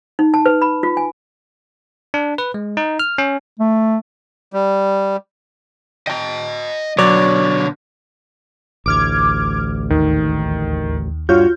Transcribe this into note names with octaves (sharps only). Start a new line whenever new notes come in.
D#4
A5
B4
B5
F4
G#5
D4
B4
G#3
D#4
F6
C#4
A3
G3
D#5 G5 A5 A#5
B2 D3 F#3 C#5 D5 D6
A1 D2 D6 F6 G#6
D#2 D#3
G2 F4 F#4 C#5 G6